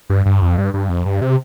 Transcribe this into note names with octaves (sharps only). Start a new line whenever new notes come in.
G2
G2
F2
G2
G2
F2
G2
C3